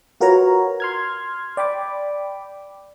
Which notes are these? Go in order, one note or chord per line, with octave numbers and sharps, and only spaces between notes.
F4 F#4 A#4 B4 C#5 A#5
C6 F6 G#6
D5 G5 B5 D6